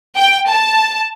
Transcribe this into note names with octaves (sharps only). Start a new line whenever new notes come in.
G5
A5